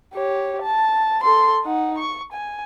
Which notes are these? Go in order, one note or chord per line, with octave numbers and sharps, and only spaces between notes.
G4 C#5
A5
A4 C6
D#4 F#5
C#6
G#5